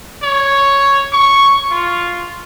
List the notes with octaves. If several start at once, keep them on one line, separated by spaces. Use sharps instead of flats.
C#5
C#6
F4